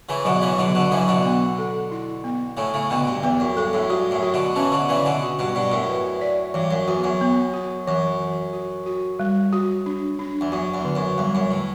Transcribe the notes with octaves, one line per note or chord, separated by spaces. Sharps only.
C#3 E3
B2 D3 F#3
C#3 E3
B2 D3 F#3
B2 D3
C#3 E3 F#3
B2 D3
B3
A4
E4
B3
A2 C#3 A4
A2 C#3
B2 D3 B3
G2
E2 B3
F#2
G2 A4
F#2 A2
G2 F#4
F#2 A2
F#4
B2 D3
C#3 E3 C#4
B2 D3
C#3 E3 D5
B2 D3
F#4
G2 B2
G2 B2 D5
F#2 A2
B4
D5
G2 E3
F#2
E2 F#4
F#2
B3
F#4
F#2 E3
E3
F#4
F#4
G3
F#4
D4
D4
E2
F#2 F#4
E2
D3
F#2
E2 G3
F#2
A2 D3